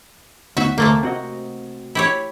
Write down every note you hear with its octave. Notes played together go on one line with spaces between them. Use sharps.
D2 B3 D#4 F#4 E5
D2 C3 A3 A#3
C4 F#4 D#5
E4 G4 C#5